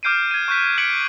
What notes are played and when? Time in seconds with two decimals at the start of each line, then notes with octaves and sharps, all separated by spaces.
0.03 D6 F6 G6 C7 D7 D#7
0.31 G#6 D#7
0.48 C#6 F#6 G6 B6
0.78 F6 G#6 B6 C#7 D7 F#7